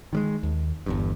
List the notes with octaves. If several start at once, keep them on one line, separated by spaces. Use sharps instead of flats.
D#3 G3 G#3
D#2
G1 E2 G2